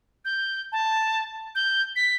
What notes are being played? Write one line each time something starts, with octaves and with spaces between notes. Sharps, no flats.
G6
A5
G6
B6